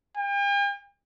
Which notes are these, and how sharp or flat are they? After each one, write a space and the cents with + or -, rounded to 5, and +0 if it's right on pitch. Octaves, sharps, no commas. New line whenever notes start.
G5 +45